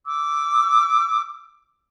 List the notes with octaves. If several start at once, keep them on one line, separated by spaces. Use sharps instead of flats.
D6 E6